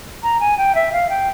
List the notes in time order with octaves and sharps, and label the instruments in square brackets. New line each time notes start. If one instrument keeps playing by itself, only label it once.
[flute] A#5
G#5
G5
E5
F5
G5